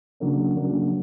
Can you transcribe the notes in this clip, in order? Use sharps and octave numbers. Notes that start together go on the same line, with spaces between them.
C#3 F#3 A#3 D4
C#3 F#3 A#3 D4